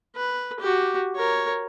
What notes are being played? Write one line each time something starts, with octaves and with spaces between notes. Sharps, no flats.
B4
F#4 G4
A#4 C#5